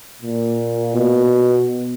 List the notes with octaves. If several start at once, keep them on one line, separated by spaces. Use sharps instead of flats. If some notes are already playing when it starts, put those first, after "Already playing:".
A#2
B2